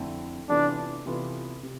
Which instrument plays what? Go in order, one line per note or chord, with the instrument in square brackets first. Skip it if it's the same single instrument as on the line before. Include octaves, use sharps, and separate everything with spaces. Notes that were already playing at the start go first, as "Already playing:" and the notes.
Already playing: [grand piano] F2 D3 A3 C4 E4
[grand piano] C3 E3 B3 F4 A4 [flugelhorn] D4
[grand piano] C3 E3 B3 F4 A4
C3